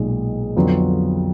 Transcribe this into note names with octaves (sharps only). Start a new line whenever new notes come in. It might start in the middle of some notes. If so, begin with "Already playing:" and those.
Already playing: B1 A#2 G#3 D#4
F2 D3 F#3 B3 F4